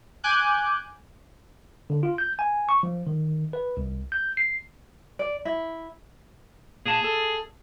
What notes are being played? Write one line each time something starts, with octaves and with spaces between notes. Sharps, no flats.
G#5 D6 F#6 G6
D3
F4
G6
G#5
C#6
F3
D#3
B4
C2
G6
C7
D5
E4
A#2 G#4 A5
A4